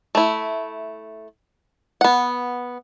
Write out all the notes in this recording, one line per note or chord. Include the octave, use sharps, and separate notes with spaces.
A3 E4
B3 F#5